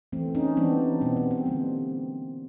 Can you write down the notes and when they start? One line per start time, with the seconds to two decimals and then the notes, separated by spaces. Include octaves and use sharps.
0.12 E3 A3 C4
0.35 C#4 D#4
0.57 E3 G3 B3 C4 D4
1.01 B2 G3 B3 C4
1.17 C4
1.31 C4
1.46 D3 G3 A#3